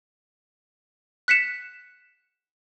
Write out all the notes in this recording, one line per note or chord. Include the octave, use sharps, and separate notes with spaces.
F#6 B6 C#7 E7